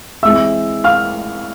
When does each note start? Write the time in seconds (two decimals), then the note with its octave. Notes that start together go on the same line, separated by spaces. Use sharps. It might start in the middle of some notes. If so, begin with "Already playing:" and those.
0.23 E3 G#3 C4 E5 E6
0.84 F5 F6